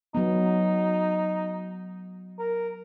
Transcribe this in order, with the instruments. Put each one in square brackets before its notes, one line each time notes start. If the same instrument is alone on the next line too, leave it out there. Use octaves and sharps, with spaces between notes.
[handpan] F#3 B3 [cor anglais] D#4
[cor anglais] A#4